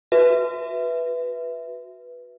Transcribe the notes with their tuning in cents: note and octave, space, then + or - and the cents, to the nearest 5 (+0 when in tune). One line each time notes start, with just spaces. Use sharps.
F#4 -10 B4 +0 E5 +0